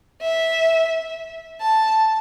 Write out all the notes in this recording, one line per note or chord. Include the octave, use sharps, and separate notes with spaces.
E5
A5